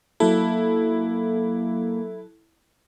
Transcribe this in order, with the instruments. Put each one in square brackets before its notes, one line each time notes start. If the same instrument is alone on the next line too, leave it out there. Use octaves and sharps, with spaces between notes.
[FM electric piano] F#3 A4 [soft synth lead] A#3 [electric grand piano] E4